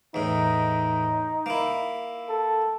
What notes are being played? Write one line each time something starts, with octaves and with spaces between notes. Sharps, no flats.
E2 A2 D#4
A#3 E4
A4